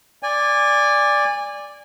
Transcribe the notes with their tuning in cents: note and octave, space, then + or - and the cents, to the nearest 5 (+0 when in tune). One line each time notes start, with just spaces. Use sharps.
D5 +0 G#5 -25